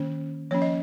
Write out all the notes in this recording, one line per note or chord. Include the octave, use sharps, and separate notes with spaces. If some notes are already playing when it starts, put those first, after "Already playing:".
Already playing: D#3 A#3 C#4
F3 A#3 C#4 C#5
D#5